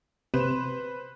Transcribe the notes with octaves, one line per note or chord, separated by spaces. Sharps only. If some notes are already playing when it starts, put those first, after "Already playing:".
C3 B4 C5 E7